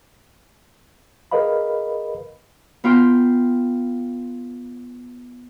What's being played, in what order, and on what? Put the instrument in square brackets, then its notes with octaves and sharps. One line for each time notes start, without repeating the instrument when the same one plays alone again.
[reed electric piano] G#4 A#4 B4 D#5 F5 B5
[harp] B3 F4 G5 C6